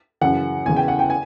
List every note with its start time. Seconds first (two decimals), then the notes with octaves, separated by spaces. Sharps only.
0.21 F#2 C#3 E3 F#5
0.66 E2 C#3 E3 G#5
0.76 G5
0.88 F#5
0.99 G5
1.10 G#5